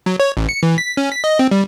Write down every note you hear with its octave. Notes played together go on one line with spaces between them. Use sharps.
F#3
C#5
A1
C#7
E3
B6
C#4
B6
D#5
C4
G3